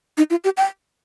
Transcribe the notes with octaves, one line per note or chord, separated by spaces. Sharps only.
D#4
F4
G4
G5